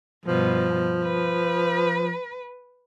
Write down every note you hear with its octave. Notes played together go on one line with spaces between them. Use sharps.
G2 B2 F3
B4